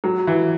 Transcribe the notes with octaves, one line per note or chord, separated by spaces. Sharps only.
F#3
E3